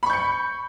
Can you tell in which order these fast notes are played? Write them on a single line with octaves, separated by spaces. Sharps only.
B5 C#6 G6 C#7